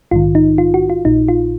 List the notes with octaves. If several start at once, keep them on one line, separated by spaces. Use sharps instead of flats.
A#1 G#2 D#3 F4
D#4
F4
F#4
F4
A#1 A#2 D#4
F4